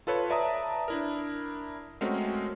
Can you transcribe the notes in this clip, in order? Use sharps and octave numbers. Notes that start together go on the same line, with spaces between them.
F4 A4 B4 C#5
B4 D5 E5 A5 A#5 D#6
D4 E4 A#4
G#3 A3 C4 C#4 F#4 A#4